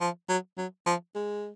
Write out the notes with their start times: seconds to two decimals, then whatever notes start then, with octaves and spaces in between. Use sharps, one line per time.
0.01 F3
0.29 F#3
0.58 F#3
0.86 F3
1.15 G#3